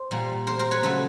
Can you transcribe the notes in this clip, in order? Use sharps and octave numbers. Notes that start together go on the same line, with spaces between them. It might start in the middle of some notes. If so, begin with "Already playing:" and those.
Already playing: C5
A#2 G3 A#3
A#4 C5
A#4 C5
B4 C#5
C#3 F#3 A3 A4 B4